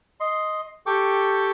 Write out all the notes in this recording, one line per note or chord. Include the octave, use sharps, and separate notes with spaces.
D#5 C6
G4 A4 G5 C#6 D6